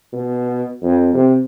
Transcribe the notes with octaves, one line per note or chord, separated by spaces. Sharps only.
B2
F2
C3